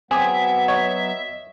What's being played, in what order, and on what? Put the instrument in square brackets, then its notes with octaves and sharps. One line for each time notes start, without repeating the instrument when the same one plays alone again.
[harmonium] F#3 B3 [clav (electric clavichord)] C4 G#4 [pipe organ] E5 [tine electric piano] G#5 D6
[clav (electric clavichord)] C#5 [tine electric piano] D#5